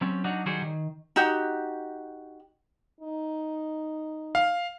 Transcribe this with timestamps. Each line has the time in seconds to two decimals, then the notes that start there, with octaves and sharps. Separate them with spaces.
0.01 F#3 G3 C4 C#4
0.24 F#3 D4 D#4 F#4
0.46 D#3 F#3 G3 F#4 G#4 C5
0.62 D#3
1.16 D#4 F#4 G4
3.00 D#4
4.35 F5